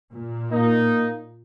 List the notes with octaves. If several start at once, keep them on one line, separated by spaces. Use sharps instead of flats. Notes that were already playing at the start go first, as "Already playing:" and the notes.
A#2
A#3 D#4